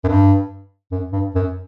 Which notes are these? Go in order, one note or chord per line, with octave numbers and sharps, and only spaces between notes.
F#2
G2
F#2
G2
F#2